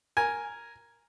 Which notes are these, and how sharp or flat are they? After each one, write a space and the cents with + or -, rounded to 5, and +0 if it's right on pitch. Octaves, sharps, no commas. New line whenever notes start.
A#4 +0 G#5 +0